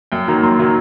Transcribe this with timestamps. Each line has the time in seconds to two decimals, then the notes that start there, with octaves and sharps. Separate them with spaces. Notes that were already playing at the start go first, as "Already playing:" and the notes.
0.12 F#2 G5
0.28 D#3 F#3 A#3
0.43 F#2 C6
0.59 D#3 F#3 A#3